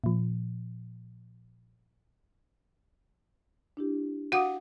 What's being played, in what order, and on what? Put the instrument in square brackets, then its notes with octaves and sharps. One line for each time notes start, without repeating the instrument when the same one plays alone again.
[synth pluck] A#2 F3
[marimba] D4 E4 G4
[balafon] F#4 F#5 [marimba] F5 D6 D#6